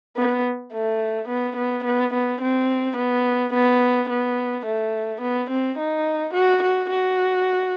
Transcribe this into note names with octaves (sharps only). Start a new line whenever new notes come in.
B3
A3
B3
B3
B3
B3
C4
B3
B3
B3
A3
B3
C4
D#4
F#4
F#4
F#4